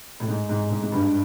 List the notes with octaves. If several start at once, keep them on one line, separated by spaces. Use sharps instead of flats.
A2
G#2
G#2
G#2
G#2
G2